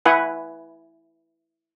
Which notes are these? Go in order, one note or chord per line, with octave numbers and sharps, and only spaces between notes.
E4 B4 F#5 G#5